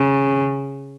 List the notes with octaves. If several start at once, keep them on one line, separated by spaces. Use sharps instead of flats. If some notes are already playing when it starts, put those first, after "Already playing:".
Already playing: C#3